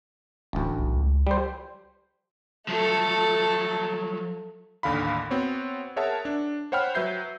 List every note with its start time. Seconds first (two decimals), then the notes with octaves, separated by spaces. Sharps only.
0.53 D#1 A1 D2
0.78 B1
0.93 C#2
1.27 G3 C5
2.68 F3 F#3 A3 A4
4.83 A1 D#2 D3 F5 B5
5.31 B3 C4 F#4 C#5
5.96 G#4 A#4 C#5 E5 F#5 A5
6.25 D4
6.72 C5 C#5 F#5 G5 B5 F6
6.95 F#3 B4 E5 G6 C7